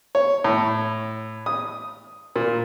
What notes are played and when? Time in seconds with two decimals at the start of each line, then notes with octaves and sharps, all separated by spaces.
0.15 C#5
0.44 A2
1.46 D#6
2.36 A#2